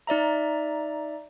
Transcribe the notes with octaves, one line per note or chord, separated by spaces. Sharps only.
D#4 D5 E5 A#5